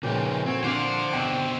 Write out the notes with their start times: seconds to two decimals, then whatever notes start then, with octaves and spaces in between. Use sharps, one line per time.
0.03 A#2 C#3 F3 G#4 B4 C#5 G5
0.46 C4 F#4 A4 C#5
0.64 C2 D3 C5 F5 F#5 D6
1.13 B2 C4 G5